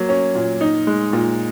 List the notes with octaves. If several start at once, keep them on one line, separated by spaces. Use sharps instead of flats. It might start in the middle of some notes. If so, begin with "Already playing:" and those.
Already playing: F#3 A#3
C#4
A#2
D#4
G#3
A#2